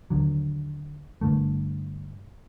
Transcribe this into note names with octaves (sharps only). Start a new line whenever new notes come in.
D#2 D3 F#3
G1 G2 D3 A3